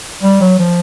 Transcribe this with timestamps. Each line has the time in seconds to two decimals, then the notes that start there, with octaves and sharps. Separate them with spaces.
0.23 G3
0.41 F#3
0.59 F3